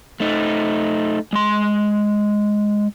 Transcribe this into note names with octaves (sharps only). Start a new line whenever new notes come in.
A3 D#4
G#3 C6